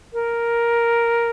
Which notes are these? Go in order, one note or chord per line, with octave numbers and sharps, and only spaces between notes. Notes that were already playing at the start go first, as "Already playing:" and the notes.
A#4